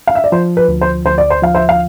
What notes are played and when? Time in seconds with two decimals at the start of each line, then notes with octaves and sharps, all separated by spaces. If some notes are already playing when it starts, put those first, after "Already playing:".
0.07 F5
0.15 E5
0.24 D5
0.32 F3 C5
0.57 B4
0.68 D2
0.81 C5
1.05 D2 C5
1.18 D5
1.30 C5
1.42 F3 F5
1.55 C5 E5
1.69 F5